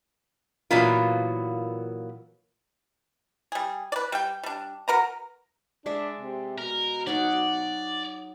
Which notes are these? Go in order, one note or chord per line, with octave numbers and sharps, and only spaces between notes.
A#2 E3 F#3 A#3 B3 F4
G3 G#4
B4 D5
G3 G5
G3 D4
F#4 A#4 B4 A#5
G#3 D4 D5 E5
C3
B2 A#4
F#3 D#4 D5 F#5